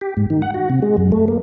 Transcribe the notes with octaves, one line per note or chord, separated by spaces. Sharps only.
G4
G#2
D#3
F#5
F#4
C3
G#3
F#2
A3
A#3